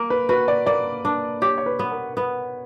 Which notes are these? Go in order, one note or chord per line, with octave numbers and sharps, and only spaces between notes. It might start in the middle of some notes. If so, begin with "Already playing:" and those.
Already playing: A#3 A#4
B4
F#4 B4
D5
A#3 D5
D4
G4 C#5
C#5
B4
B3
A#4
B3 B4